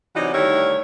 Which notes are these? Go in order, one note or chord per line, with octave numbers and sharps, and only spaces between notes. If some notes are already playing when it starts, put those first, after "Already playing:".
C3 E3 F#3 D#4 F#4 D5
D2 D#3 G3 E4 G4 C#5